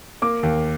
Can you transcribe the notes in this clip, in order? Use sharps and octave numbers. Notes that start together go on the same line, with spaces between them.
A#3 D6
D#2